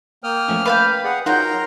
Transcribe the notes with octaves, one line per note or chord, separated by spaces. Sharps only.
A#3 G5 D#6 F6
F3 A3 C#4
B4 F5 G5 A5 B5 D6
G#4 D5 F#5
F#3 D#4 F4 A#4 F#5 G5 A#5 C6